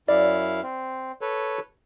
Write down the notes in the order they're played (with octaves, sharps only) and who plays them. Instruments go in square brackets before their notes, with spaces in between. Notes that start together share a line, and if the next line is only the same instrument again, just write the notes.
[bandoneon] F#2 E4 F5 [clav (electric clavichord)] D5
[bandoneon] C4
A4 B4 C#5